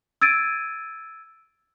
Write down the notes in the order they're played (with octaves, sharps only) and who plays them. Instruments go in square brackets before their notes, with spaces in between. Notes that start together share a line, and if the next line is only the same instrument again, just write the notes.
[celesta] E6 G#6 A6 D7 D#7